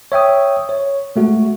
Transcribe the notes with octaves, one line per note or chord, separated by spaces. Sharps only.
C#5 E5 G5 D#6
C#5
G#3 A3 F#4 A4